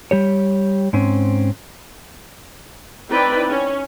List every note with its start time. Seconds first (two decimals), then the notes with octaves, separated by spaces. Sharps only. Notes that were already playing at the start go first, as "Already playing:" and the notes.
0.11 G3 G4 C#5
0.93 G#2 C4 C#4
3.10 C4 D#4 E4 B4 D5 G5
3.49 C#4